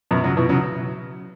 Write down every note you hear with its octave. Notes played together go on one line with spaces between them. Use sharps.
F#2 B2
C#3 F#3
B2 E3
C#3 F#3